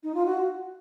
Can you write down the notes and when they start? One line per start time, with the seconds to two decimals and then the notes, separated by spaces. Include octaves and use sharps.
0.03 D#4
0.15 F4
0.26 F#4